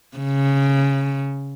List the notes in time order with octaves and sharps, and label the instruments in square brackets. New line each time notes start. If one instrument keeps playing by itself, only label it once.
[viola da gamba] C#3